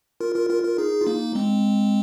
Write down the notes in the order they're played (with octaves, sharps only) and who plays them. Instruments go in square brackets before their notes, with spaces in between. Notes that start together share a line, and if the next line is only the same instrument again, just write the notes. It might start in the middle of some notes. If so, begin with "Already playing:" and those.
[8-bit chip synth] F4 A#4
F4 A#4
F4 A#4
F4 A#4
D#4 G#4
F4
A#3 D#4
G#3 C4